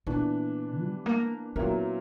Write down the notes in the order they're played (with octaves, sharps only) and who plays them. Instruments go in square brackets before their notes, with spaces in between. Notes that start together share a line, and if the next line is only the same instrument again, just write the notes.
[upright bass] A#2 [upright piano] E3 B3 D4
[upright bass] G3
A#3
[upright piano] A#2 F#3 B3 E4 A#4 [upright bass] C#4